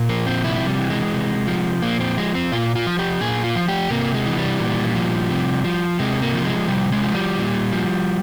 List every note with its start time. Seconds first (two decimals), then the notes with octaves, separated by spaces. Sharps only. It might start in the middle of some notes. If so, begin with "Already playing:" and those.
Already playing: A#2
0.09 F3 A#3
0.26 C4
0.44 C3 E4
0.66 G3
0.79 E3
0.90 G#3
1.13 C3
1.47 F3
1.82 A#2 A#3
2.00 C4
2.17 F3 G#3
2.35 C4
2.52 A#2 F4
2.76 F4
2.87 F3
2.99 G4
3.21 A#2 G#4
3.44 F4
3.55 F3
3.68 G4
3.91 C3 A#3
4.14 G#3
4.26 E3
4.38 G3
4.60 A#2
4.95 F3
5.30 C3
5.64 F3
5.99 C3 G#3
6.22 A#3
6.34 F3
6.45 G#3
6.68 C3 G3
6.92 G#3
7.03 F3
7.15 G3
7.38 A#2
7.73 F3